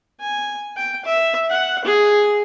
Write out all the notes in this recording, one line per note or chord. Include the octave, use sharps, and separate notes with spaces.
G#5
G5
E5
F#5
G#4